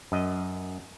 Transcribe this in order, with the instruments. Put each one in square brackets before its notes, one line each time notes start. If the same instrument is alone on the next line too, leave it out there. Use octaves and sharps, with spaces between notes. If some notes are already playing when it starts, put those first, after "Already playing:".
[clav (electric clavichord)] F#2 D#5